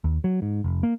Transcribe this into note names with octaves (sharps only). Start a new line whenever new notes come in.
D#2
F#3
G#2
F1
A#3